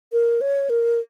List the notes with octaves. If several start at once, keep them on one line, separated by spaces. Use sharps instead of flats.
A#4
C#5
A#4